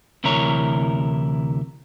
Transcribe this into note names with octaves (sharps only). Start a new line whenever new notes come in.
D2 C3 E3 E4 A#4 C#5